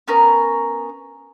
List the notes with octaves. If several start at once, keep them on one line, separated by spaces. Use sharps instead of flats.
B3 C#4 A#4